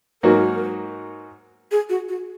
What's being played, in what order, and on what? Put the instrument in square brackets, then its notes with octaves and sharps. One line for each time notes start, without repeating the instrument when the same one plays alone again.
[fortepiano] G#2 F#3 A#3 D#4 F#4 [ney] A#4
[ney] G#4
F#4
F#4